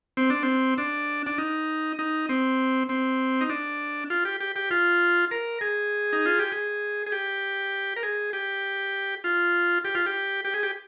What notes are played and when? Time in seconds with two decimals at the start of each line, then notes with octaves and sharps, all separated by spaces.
0.17 C4
0.30 D4
0.43 C4
0.78 D4
1.26 D4
1.38 D#4
1.99 D#4
2.29 C4
2.89 C4
3.41 D#4
3.50 D4
4.10 F4
4.25 G4
4.40 G4
4.56 G4
4.71 F4
5.31 A#4
5.61 G#4
6.13 D#4
6.26 F4
6.39 G4
6.52 G#4
7.06 G#4
7.12 G4
7.96 A#4
8.03 G#4
8.33 G4
9.24 F4
9.85 G4
9.95 F4
10.06 G4
10.45 G4
10.54 G#4
10.63 G4